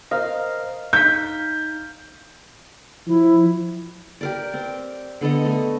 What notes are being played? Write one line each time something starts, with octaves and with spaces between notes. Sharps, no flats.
A#4 C5 D#5 F5
D#4 G6 B6
F3 E4
G4 A#4 D5
C4
D3 B3 A4 D#5
A3 D#5